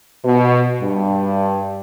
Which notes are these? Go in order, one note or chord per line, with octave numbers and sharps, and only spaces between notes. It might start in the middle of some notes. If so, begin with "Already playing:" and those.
B2
G2